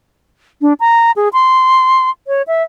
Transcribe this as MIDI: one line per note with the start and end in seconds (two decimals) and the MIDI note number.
0.61 0.73 62
0.80 1.12 82
1.16 1.29 68
1.33 2.10 84
2.27 2.42 73
2.47 2.63 76